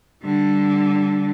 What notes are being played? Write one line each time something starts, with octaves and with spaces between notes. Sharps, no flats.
D3 G3